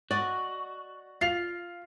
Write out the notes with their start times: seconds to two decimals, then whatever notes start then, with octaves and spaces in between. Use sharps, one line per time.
0.11 F#4 D5 D#5
1.21 F4 C7 F7